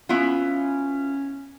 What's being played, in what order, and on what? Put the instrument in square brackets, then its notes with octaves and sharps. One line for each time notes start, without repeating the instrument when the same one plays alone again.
[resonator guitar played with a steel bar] B3 E4 F4 [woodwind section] C#4